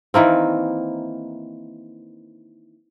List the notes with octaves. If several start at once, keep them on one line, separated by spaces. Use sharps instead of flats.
D#3 E3 A#3 C4